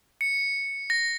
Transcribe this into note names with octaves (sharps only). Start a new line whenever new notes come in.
C#7
A#6